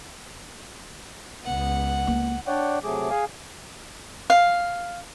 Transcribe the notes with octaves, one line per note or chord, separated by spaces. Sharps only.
C#2 B3 F#5
A#3
D4 C#5 D5 F#5 G5
C3 F#3 A3 G#4 D6
G#4 F5 G#5
F5